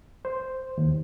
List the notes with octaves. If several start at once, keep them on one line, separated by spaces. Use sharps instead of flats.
C5
D#2